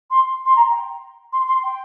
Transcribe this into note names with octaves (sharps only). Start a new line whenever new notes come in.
C6
C6
A#5
G5
C6
C6
G5